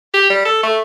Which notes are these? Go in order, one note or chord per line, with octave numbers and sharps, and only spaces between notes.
G4
G3
A4
A3